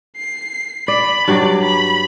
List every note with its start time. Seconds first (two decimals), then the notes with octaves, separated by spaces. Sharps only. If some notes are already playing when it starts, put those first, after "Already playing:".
0.17 C7
0.88 D5 B5
1.28 G2 F#3 D5
1.62 B5